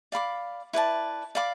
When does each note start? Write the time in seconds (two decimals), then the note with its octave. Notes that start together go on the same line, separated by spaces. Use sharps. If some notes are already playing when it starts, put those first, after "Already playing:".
0.12 D5 F5 B5 D6
0.73 E4 B4 D5 A5
1.35 D5 F5 B5 D6